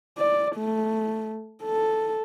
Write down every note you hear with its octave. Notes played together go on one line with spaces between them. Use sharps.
D5
A3
A4